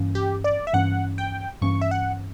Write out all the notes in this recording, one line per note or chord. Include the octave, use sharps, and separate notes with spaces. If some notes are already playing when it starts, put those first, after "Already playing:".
Already playing: G2 E3 A#3 C#4
G4
D5
E5
G2 E3 A#3 C#4 F#5
G5
G2 E3 A#3 C#4 C#6
E5
F#5